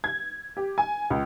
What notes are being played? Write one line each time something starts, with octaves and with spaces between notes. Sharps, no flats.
G#6
G4
G#5
C#2